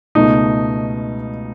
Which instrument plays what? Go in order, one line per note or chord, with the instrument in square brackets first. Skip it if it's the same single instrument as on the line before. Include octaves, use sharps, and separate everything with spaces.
[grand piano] C#2 B2 A3 D#4